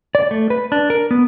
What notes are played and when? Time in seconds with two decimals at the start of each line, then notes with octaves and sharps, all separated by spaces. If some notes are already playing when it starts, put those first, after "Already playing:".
0.15 D5
0.31 A3
0.50 B4
0.72 D4
0.90 A#4
1.11 B3